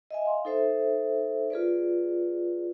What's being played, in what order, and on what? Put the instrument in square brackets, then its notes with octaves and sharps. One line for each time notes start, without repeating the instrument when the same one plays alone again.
[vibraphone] D#5 E5 G#5
F5 C6
D#4 A4 C5 E5
F4 G#4 B4 D5